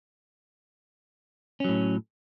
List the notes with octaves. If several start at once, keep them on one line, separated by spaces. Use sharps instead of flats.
A2 F#3 C#4